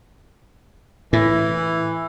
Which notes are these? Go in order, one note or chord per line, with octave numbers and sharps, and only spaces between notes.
A2 E3 E4